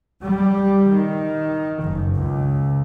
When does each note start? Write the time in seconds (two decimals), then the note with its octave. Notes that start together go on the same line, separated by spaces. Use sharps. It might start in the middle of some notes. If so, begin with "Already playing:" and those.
0.24 G3
0.91 D#3
1.83 F#1
2.16 C#2